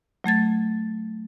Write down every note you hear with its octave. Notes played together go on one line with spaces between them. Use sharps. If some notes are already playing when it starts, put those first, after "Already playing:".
F#3 A3 G#6 A6